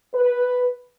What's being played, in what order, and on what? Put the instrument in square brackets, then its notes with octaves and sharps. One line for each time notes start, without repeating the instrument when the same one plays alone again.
[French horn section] B4